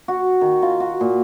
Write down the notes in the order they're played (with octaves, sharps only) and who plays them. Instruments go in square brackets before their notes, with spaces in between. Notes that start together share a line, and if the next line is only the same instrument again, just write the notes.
[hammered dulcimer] F#4
D#3
F4
F#4
A#2